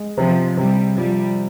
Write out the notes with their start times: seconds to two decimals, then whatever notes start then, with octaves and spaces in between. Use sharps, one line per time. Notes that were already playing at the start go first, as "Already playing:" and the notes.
Already playing: G#3
0.17 C3 F3
0.57 C3 G3
0.97 F3 G3